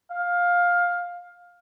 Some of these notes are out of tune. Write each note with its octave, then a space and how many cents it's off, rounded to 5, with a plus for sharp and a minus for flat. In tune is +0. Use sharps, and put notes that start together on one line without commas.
F5 +15